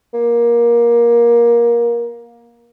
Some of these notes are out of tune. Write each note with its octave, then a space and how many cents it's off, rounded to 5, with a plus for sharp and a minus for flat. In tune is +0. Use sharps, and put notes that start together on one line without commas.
A#3 +20